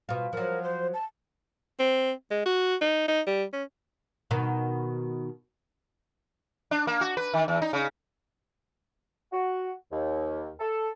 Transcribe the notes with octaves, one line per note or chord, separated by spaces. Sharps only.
B2 F4
F3 F#3 A#4
C5
A5
C4
G#3
F#4
D#4
D#4
G3
C#4
B2 D#3
D4
A#3
F#4
B4
D#3
E2
D#4
C#3
F#4
D#2
A4